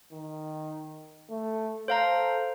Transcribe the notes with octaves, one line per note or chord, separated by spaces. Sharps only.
D#3
A3
A4 C5 F5 A#5